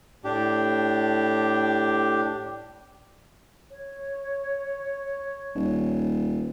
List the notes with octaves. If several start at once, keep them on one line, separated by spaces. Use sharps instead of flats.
A2 D4 G4
C#5
D#1